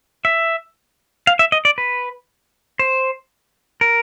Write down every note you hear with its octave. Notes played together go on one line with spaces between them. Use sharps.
E5
F5
E5
D#5
D5
B4
C5
A#4